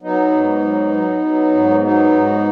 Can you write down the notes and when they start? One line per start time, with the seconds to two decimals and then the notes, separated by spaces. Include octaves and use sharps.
0.01 F#3 B3 D#4
0.32 G#2
0.61 F#3
0.91 F#3
1.21 F#3
1.51 G#2
1.80 F#3 B3 D#4
2.10 G#2